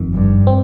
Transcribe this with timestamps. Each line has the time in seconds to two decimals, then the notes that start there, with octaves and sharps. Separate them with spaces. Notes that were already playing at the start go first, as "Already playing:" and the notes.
Already playing: G1 F2 D#3
0.14 G2
0.47 C4